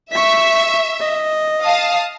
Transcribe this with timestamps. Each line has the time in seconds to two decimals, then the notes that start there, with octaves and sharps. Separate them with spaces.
0.12 E5 C#6 B6
1.01 D#5
1.64 F5 A5 D#6